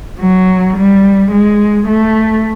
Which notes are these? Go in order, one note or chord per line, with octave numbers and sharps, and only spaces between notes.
F#3
G3
G#3
A3